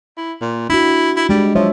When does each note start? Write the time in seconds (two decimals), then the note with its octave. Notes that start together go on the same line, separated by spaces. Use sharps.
0.17 E4
0.41 A#2
0.70 D4 E4 F#4
1.16 E4
1.29 G3 G#3 D4
1.55 F3 F#3 C#5 E5